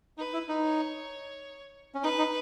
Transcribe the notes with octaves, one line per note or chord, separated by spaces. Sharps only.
D#4 B4
E4
D#4
C#5
C#4
D#4 B4
D#4